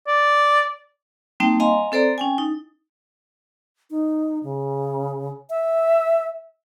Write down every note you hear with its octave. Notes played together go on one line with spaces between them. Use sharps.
D5
G3 A#3 C4 D#4 G5 A5
D#5 F5 G#5 A#5 C6
C4 A4 C5 D5 A#5
C#4 G5 G#5
D#4
D#4
C#3
E5